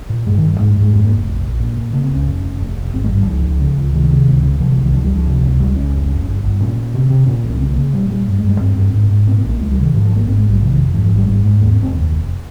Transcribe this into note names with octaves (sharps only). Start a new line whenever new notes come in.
A#2
G2 G#3
D#3
G2
G#2 G#3
G#3
G#2
G#3
F2 G#3
A#3
F1
A#1
A#1
A#2
A#2
C#3 A#3
C4
C#2 C#4
F1
F1
F1
F1
G#1 C4
G#3
G2
G3
C#2 F3
C#2
C#3
C#2
C3 D#3
C3
C#2
C#3
C3 F3
F3
C2
D#3
C#2 F3
G3
C#2 F3
C3
C#2
C#2 G3
C#2 C#4
F1
F1
G1
G1
A#2 C#4
A#2
C3
C3
A#2 C#4
C2
C#4
C#3 C4
A#3
C#3
A#2 G3
A#2 G3
G2
G#3
G2
G#3
G2 C4
G2
G#2
G#2
A#2 C4
C4
A#1
A#3
C#2 G#3
G3
C3
D#3
G#2 F3
F3
G#1
A#3
G#2 C4
G#3
A#1
G3
C3 F3
D#3
F2
G#2 F3
F3
G#1
G3
G#2 G3
G#2 G#3
D#2 A#3
C4
F1
C4
D#2
F1